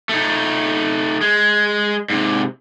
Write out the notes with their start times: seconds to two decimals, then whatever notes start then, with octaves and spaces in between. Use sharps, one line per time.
0.09 A3 D#4
1.21 G#3
2.10 G#2 C3